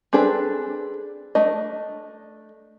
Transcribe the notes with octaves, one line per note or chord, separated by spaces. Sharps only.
C4 D4 G#4 A4 B4
A3 D4 D#5